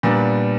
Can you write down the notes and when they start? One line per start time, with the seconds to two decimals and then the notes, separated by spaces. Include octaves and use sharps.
0.03 A#2 G3 B3 D4